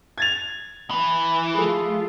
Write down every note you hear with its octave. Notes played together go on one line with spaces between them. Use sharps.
G#6 A6 F7
E3
F3 A3 F4 G#4 A4